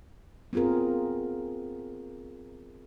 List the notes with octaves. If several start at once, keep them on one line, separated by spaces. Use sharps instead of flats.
B3 C4 F4 G#4 A#4